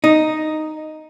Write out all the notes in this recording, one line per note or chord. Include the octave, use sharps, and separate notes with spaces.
D#4